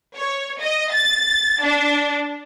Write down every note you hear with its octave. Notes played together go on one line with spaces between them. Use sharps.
C#5
D#5
A6
D4